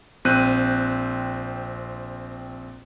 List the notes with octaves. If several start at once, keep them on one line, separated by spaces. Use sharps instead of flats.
A#1 C4 F#6 G6 D#7